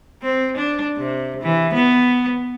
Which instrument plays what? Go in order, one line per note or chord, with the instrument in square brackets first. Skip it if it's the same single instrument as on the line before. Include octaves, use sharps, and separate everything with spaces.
[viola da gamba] C4
D4
C3
E3
B3